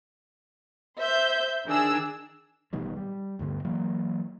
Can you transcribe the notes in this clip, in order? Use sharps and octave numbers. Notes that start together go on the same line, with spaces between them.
C5 E5 G6
D#3 D4 G#4 E6
A1 B2 D#3 G3
G3
D2 G2 D3 B3
E3 F#3 A#3